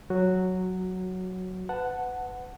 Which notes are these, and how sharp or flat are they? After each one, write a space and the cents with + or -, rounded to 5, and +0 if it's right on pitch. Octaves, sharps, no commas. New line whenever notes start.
F#3 +0 F#4 +0
B4 +30 F#5 +0 A5 +5